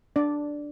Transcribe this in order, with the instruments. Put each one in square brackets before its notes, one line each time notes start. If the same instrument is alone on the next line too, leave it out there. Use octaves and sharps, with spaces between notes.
[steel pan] D4 D5